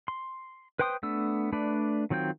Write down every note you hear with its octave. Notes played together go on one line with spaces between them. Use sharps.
C6
B4 C5 G5 C6 D#6
A3 B3 D4 E6
A3 D4 B4 D5
D#3 F#3 C4 F4 G5